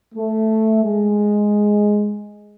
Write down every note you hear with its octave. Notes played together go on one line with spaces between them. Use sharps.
A3
G#3